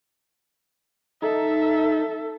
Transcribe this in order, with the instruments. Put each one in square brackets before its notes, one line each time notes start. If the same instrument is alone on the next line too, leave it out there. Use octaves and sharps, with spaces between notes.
[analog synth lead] D#4 [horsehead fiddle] A4 [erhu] E5